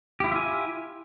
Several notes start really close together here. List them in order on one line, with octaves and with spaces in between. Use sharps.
G4 E4 F4 E5 G#5